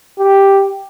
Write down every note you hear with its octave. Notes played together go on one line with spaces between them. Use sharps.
G4